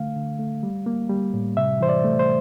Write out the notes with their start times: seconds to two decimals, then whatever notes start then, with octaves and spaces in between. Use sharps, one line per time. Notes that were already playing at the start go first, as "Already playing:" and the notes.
Already playing: D3 A3 F5
0.16 D3
0.39 A3
0.63 G3
0.86 A#3
1.10 G3
1.34 A2
1.57 C3 E5
1.81 E3 C5
1.89 D5
2.04 A3
2.19 C5